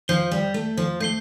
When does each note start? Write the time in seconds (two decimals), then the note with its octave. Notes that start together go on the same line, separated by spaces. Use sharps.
0.08 F3 G6 C7 G7
0.31 G3
0.54 A3
0.77 F3
1.00 A3 G6 C7 G7